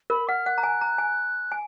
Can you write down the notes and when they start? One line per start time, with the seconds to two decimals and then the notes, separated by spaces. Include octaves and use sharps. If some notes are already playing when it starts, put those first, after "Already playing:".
0.10 A#4 B5
0.28 F#5 F6
0.46 F#5 F#6
0.58 A#5
0.63 G#5
0.81 A#5
0.98 G#5
1.52 G#5